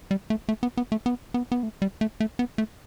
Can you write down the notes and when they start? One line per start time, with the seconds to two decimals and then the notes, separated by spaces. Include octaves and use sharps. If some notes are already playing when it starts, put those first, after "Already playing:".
0.11 G3
0.30 A3
0.49 A3
0.63 B3
0.77 B3
0.92 A3
1.06 B3
1.34 B3
1.52 B3
1.63 A3
1.82 G3
2.01 A3
2.20 A3
2.39 B3
2.58 A3